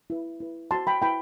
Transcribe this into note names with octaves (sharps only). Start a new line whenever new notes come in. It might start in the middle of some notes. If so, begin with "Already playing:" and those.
E4 B4
E4 B4
F#4 C5 A5 C6
G5 B5
E4 B4 G5 B5